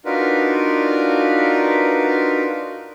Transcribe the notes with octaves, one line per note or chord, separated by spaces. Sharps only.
D4 D#4 F4 F#4 A#4 B4